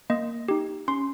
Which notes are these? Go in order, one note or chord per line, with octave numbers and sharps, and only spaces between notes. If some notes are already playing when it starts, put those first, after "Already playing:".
A#3 D#5
D#4 G4
C#4 C6